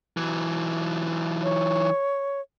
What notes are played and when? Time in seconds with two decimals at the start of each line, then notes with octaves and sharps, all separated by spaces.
0.17 E3 F#3
1.43 C#5